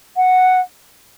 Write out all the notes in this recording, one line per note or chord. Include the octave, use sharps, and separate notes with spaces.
F#5